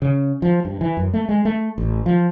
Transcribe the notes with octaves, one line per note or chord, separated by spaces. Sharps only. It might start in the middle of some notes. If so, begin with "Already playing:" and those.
C#3
F3
G2
E3
F#2
A3
G#3
A3
A1
F3